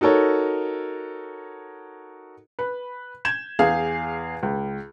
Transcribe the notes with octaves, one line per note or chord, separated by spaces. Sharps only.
D#4 F#4 A4 A#4 C#5
B4
G6 G#6 E7
E2 G#4 F5 G#5
C#2